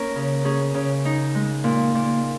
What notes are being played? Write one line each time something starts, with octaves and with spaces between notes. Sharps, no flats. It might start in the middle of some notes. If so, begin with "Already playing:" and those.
Already playing: A#3 C#4 A#4
C#3
C#4 G#4
C#3
D#4
G#3
A#2
A#2